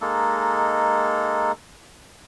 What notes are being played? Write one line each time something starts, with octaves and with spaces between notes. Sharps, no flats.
G#3 A#3 D#4 A4